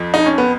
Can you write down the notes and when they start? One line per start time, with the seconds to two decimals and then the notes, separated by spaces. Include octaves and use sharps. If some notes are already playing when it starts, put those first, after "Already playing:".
Already playing: F2 F3
0.14 D#4
0.26 C#4
0.38 B3